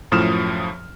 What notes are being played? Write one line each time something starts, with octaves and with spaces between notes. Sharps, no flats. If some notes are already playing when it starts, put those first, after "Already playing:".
F#2 A2 F3 D#6 F6 E7